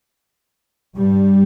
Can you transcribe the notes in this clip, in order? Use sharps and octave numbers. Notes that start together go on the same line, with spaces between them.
G2 G3